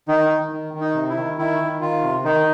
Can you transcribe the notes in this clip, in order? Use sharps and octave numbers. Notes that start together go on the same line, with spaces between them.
D#3 D#4
D#3
D#3
D#3
D#4
C3
E4
D#3
D#3 E4
D#3
D#3 F4
C3
D#3 D#4